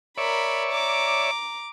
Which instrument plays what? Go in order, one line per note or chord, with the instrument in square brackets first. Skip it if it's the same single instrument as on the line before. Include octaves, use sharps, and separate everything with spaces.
[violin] A#4 B5 [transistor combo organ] C#5 D5 E5
[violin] A#5 D6